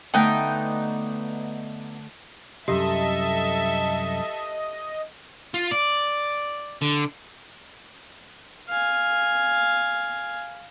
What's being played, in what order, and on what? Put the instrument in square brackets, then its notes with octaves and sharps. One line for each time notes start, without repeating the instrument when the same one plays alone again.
[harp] D3 A3 [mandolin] B3 D#4 G5
[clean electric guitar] C2 F#2 [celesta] G4 [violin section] A4 E5 [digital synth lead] D#5
[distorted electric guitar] F4
D5
D3
[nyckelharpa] F5 G#5